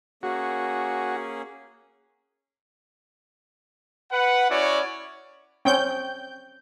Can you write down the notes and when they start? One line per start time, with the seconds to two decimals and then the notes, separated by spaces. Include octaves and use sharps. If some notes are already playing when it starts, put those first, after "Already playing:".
0.23 A#3 C#4 F#4 G#4
4.12 B4 F#5
4.50 C#4 E4 F#4 C#5 D5
5.65 C4 C#4 G5 G6